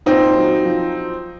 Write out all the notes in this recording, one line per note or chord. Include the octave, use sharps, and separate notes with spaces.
A#2 C4 D#4
F#3
F3